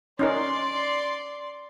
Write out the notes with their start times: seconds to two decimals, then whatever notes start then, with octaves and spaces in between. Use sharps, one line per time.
0.19 C#4 D#4 A#4 D5 C6